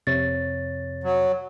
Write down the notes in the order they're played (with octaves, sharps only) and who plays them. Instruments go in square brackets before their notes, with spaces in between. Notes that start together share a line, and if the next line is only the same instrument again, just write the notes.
[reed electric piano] F2 C3 C#5 [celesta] A6
[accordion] F#3